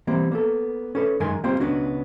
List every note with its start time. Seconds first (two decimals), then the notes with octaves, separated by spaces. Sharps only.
0.07 E3 G3 A#3 C4
0.32 A#3 B3 A4
0.95 C#4 A4 B4
1.20 F#2 D#3 G#3 A#4 G#5 C6
1.44 G3 A#3 C4 F4 C5
1.60 C#2 B3 C#4 D4 F#4